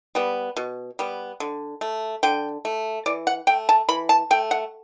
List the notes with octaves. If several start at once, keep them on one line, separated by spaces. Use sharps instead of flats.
G3 B3
B2
G3 B3
D3
A3
D3 G5
A3
E3 D5
F#5
A3 G5
A5
E3 B5
A5
A3 G5
F#5